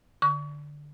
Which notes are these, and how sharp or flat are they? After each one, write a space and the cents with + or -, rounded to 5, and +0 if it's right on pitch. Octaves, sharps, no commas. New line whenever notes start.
D3 +0 C#6 +35